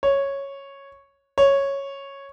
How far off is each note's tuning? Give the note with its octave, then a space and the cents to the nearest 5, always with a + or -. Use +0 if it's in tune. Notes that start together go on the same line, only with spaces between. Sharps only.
C#5 -5
C#5 -5